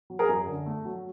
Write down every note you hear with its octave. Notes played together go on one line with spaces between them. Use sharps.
F#3
G#4 A#4
F#2
D3
A3
F#3